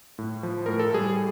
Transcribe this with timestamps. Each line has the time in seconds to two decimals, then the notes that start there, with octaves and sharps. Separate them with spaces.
0.19 A2
0.43 F3
0.66 A2 A#4
0.80 A4
0.94 G3 G#4